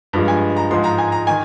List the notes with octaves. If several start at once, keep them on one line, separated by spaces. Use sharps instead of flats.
G2 F3 G#3
G#5
A#5
G#2 F3 G#3 C6
A#5
G#5
A#5
D#3 G#5